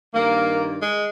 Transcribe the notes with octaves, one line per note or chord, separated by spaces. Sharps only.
G2 D#3 A#3
G#3